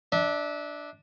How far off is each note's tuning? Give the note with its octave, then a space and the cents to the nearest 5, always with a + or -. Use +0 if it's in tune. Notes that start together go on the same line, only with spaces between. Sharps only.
D4 +5 E5 -30